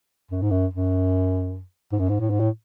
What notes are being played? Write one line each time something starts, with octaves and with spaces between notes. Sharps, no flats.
F#2
G#2
F#2
F#2
G#2
F#2
G#2
A2
G#2
A2